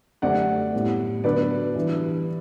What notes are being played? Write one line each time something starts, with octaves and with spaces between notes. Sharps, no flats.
F#2 D3 A3 C4 G4 D5 F#5
A2 G3 B3
D3 F#3 B3 D4 B4 D5
E3 G3 D4 G4